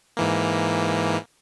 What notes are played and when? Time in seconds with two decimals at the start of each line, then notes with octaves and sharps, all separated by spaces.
0.17 G#2 E3 A#3